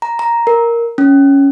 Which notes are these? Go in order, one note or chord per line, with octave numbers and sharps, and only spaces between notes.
A#5
A#5
A#4
C#4